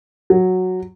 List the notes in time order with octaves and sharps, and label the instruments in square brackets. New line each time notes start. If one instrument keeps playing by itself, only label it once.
[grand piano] F#3